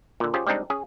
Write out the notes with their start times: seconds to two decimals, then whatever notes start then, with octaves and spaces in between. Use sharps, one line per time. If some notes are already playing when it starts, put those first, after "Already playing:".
0.20 A#2 D3
0.34 C#4 F4 G4 G#4 C5
0.47 G3 G#3 C4 D4 D#4
0.70 C#4 G#4